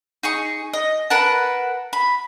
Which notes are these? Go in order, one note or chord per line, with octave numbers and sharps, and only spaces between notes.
D#4 G#4 C#6
D#5
A#4 B4 F#5 A5
B5